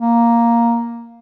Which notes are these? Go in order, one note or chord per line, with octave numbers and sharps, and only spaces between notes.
A#3